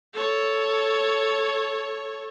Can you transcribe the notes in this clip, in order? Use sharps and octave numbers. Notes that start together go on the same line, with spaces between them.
A4 C#5